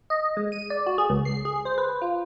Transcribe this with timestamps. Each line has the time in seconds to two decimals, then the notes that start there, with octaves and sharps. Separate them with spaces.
0.10 D#5
0.37 G#3
0.52 D#7
0.70 D5
0.86 F#4
0.98 G#4
1.10 C#2
1.25 C7
1.45 G#4
1.65 C5
1.78 B4
2.02 F4